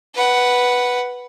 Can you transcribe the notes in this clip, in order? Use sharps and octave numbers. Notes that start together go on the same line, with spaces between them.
B4 F#5